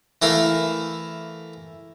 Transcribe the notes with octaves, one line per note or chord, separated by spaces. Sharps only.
E3 A3 E4 A#4 F5